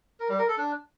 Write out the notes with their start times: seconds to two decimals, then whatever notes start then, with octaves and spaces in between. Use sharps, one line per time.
0.20 A#4
0.29 G3
0.39 A#4
0.48 A4
0.58 D4